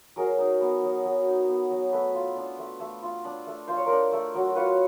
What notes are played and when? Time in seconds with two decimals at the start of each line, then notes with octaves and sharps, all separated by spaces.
0.16 F#3 G#4 A#4
0.39 D#4
0.61 B3
0.83 F#3
1.04 F#3
1.27 D#4
1.48 B3
1.70 F#3
1.92 A3 A4 B4
2.14 F4
2.36 D4
2.58 A3
2.80 A3
3.02 F4
3.25 D4
3.46 A3
3.67 F4 C5
3.77 C#5
3.86 D4 A#4 C5
4.12 A3
4.34 F#3
4.55 F4 B4 C#5